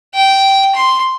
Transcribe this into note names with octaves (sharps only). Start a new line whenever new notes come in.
G5
C6